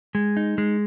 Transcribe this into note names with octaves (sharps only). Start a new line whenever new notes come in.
G#3
D#4
G#3